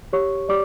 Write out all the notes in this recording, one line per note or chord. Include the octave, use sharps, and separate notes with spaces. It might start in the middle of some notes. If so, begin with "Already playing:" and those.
G4 C#5 C#6
G4 D5 D6